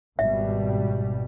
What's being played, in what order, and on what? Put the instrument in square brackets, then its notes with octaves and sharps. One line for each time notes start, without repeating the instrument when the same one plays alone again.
[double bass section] G#1 B2 G3 [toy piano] E5